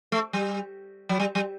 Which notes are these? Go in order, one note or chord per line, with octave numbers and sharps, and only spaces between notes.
A3
G3
F#3
G3
G3